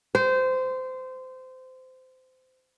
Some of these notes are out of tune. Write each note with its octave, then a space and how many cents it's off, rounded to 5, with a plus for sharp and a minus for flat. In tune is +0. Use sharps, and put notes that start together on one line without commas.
C5 -20